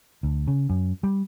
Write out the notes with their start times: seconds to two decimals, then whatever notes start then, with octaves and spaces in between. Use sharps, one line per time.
0.23 D2
0.48 C#3
0.69 F#2
1.03 G3